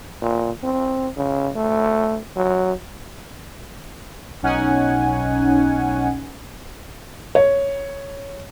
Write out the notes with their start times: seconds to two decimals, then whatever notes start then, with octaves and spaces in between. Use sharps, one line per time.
0.22 A#2
0.64 C4
1.17 C#3
1.56 A3
2.36 F#3
4.42 B1 C#4 D#4 F#5 G#5
7.35 C#5